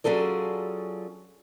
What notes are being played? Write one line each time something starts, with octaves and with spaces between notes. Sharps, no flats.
F#3 C#4 F4 G#4 A4 D5